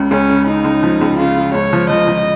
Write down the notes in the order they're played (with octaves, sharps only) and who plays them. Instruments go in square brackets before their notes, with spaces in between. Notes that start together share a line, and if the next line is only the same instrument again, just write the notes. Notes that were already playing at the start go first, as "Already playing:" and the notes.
Already playing: [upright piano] C#2 C#3
[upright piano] C#2 [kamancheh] C#4
[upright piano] C#3
[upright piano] C#3 [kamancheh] D#4
[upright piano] C#2
F3
C#2
[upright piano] C#3 [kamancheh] F4
[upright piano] C#3
[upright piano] C#2 [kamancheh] C#5
[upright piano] F3
[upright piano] F3 [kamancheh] D#5
[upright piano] F3